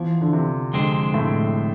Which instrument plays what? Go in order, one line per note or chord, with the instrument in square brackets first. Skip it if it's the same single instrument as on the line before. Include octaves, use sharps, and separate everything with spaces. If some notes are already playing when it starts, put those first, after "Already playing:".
Already playing: [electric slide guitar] E3 B3 E4 [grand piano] F3
[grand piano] D3
C3
[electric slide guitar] F2 D3 G#3 C4
[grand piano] A2